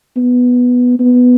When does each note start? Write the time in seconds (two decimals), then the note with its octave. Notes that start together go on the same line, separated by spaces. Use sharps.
0.17 B3
1.00 B3